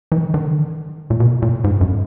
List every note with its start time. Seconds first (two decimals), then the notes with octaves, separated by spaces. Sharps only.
0.12 E3
0.34 D#3
1.10 A#2
1.20 B2
1.42 A#2
1.64 G#2
1.81 F#2